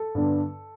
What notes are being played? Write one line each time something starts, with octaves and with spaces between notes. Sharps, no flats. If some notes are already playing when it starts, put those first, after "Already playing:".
Already playing: A4
G2 D3 B3 D4